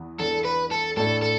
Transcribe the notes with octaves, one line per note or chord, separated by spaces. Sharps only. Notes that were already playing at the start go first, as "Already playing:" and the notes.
Already playing: E2 E3 B3
E2 E3 B3 D4 A4
B4
A4
A2 A3 D4 A4
A4